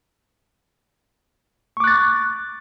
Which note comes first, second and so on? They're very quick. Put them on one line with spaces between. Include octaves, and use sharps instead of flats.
C#6 D6 F#6 A6